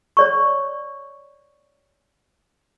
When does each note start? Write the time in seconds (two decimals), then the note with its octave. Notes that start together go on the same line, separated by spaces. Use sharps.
0.17 C#5 D5 C#6